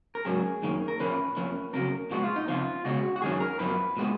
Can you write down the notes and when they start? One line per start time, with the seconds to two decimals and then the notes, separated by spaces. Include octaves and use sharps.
0.15 A#4
0.25 G#2 F#3 A#3 C#4 G#4
0.63 F#2 D#3 A#3 C#4
0.88 A#4
1.00 A#2 F3 A#3 C#4 B4
1.37 F2 F3 A#3 C#4
1.73 F2 C#3 F#3 A#3 A#4
2.11 A#2 F3 G#3 B3 F#4
2.24 F4
2.36 D#4
2.47 F2 C#3 F3 B3 F4
2.85 C#2 B2 G#3 C#4 F#4
3.16 F#4
3.22 F#2 D#3 F#3 C#4 G#4
3.40 A#4
3.59 F#2 F3 B3 B4
3.97 A#2 G#3 B3